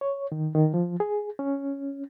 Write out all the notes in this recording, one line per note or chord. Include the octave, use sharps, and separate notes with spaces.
C#5
D#3
D#3
F3
G#4
C#4